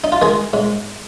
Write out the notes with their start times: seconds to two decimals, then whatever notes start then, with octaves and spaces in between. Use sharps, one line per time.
0.04 D#4
0.12 F4
0.22 D#3 G#3 G#4
0.53 G#2